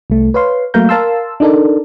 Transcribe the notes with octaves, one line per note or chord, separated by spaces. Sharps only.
C2 A3
B4 C#5 F5 C6
F#3 A3 A#3 F5 A#5 G6
A#4 F5 A5 C6 E6
D4 D#4 A4 A#4 D5